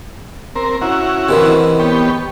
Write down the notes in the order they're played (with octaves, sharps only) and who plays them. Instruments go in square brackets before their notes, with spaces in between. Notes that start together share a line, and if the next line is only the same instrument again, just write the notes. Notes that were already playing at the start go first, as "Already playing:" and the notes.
[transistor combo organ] C4 A#4
C#4 E4 F#4
[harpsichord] C3 D#3 E3
[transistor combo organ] B3 G4 C#5